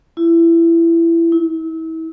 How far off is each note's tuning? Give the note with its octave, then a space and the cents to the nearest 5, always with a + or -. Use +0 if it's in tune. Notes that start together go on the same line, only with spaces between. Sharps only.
E4 +20
E4 -35